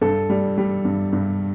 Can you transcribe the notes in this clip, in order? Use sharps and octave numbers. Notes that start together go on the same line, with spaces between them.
G2 A4
G3
G3
G2
G2